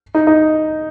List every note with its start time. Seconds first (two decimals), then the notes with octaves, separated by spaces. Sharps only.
0.15 D#4
0.27 D#4